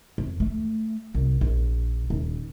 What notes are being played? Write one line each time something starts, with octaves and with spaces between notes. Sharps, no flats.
F2
A3
C2
A#1
D#1